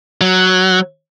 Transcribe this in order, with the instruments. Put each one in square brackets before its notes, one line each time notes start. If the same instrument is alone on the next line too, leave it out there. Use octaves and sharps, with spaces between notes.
[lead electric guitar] F#3